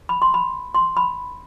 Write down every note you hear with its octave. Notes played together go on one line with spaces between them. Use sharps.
B5
C6
B5
C6
B5